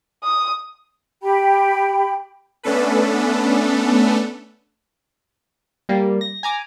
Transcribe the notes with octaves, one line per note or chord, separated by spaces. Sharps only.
D#6
G4 G5 B5
A3 B3 C#4 D4 A4 B4
G3 A#3
A#6
G#5 A#5 D6